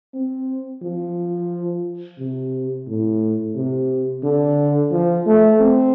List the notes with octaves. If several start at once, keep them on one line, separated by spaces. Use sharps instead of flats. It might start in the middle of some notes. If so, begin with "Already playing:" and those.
C4
F3
C3
A2
C3
D3
F3
A3
C4